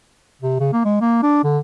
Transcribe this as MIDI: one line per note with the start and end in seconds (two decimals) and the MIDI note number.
0.42 0.56 48
0.60 0.68 49
0.73 0.83 58
0.85 0.99 56
1.01 1.18 58
1.23 1.41 62
1.44 1.58 50